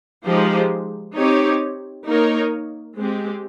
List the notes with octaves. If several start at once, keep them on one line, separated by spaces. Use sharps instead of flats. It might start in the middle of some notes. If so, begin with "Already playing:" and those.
F3 G#3 D#4 G4 C5
C4 D#4 G4 C#5
A#3 D#4 A#4 C#5
G#3 C4 G4